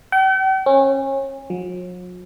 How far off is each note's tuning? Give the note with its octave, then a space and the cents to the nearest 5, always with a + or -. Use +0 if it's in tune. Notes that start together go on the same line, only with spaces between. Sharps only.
G5 -45
C#4 -30
F#3 -45